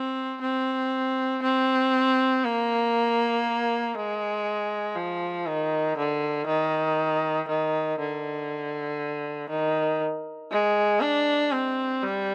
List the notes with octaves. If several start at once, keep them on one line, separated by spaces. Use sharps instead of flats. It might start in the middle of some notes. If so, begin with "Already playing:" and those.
Already playing: C4
C4
C4
A#3
G#3
F3
D#3
D3
D#3
D#3
D3
D#3
G#3
D4
C4
G3